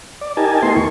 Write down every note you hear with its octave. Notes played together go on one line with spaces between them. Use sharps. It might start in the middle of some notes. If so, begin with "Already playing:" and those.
D5
D#4 G4 A#4 G#5 A5
A3 B3 D#4 E4 A#4 C6
D#2 C#6